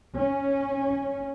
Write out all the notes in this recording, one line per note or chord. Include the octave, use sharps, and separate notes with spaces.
C#4